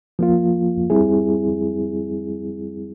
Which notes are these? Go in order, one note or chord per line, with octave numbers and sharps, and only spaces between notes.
F3 A#3 F4
G3 C4 E4 G#4